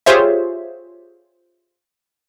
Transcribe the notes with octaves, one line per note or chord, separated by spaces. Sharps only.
F4 G4 G#4 C5 C#5 E5